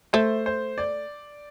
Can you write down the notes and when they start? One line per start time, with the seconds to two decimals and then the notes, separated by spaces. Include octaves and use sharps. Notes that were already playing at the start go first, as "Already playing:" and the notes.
0.13 A3 C5
0.46 C5
0.78 D5